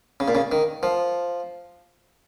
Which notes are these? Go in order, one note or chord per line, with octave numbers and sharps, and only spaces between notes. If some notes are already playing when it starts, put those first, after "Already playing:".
C#3
A#2
C#3
D#3
F3